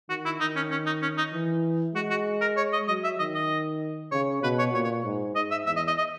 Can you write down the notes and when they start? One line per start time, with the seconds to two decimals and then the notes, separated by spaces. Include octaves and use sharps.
0.09 D#3 F#4
0.25 E4
0.41 D#3 D#4
0.56 C#4
0.71 C#4
0.86 D#4
1.02 C#4
1.18 D#4
1.33 E3
1.95 G#3 F#4
2.10 F#4
2.41 A#4
2.57 C#5
2.73 D#5
2.88 F#3 D#5
3.04 E5
3.19 D#3 D#5
3.35 D#5
4.12 C#3 C#5
4.43 B2 B4
4.59 C#5
4.73 A#2 C#5
4.84 C#5
5.04 G#2
5.36 G#2 D#5
5.51 E5
5.66 E2 E5
5.76 D#5
5.88 D#5
5.98 D#5